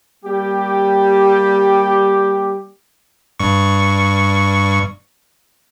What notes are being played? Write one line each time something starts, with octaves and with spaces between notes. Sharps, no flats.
G3 A#3 G4
G2 C#6